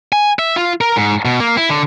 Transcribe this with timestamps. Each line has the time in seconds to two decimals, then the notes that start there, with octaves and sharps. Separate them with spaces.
0.12 G#5
0.39 E5
0.56 F4
0.81 A#4
0.96 G#2
1.25 B2
1.40 A#3
1.57 E4
1.70 D3